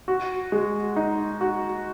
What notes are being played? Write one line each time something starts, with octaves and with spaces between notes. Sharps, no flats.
F#4
G#3
D#4
F#4